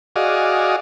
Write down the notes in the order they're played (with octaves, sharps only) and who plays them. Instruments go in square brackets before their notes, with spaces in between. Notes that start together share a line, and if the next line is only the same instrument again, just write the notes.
[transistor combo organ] F#4 G#4 D5 D#5 F5